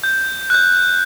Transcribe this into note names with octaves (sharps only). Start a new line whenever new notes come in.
G6
F#6 G6